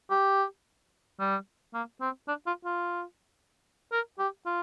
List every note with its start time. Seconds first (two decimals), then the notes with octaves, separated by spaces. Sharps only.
0.11 G4
1.20 G3
1.74 A#3
2.01 C4
2.28 D4
2.47 F4
2.65 F4
3.92 A#4
4.19 G4
4.46 F4